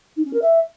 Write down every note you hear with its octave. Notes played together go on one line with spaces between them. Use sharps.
D#4
C#4
A#4
E5